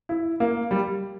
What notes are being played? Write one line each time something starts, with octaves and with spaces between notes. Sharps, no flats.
E4
A#3
G3